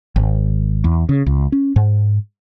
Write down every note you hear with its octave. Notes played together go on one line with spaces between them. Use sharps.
G#1
E2
C#3
C#2
C#4
G#2